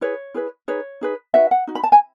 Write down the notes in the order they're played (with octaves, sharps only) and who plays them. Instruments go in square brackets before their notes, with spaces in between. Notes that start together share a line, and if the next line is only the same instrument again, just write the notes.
[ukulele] E4 G#4 B4 C#5
E4 G#4 B4
D#4 G#4 B4 C#5
D#4 G#4 B4
D#4 F#4 B4 E5
F#5
D#4 F#4
B5
A5
G#5